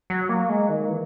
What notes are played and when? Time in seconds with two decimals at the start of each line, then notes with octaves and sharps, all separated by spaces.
0.10 F#3
0.29 A#3
0.49 G#3
0.69 D#3
0.89 E3